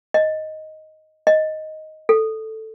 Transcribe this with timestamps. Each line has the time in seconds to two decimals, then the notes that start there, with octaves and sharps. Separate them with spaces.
0.14 D#5
1.27 D#5
2.09 A4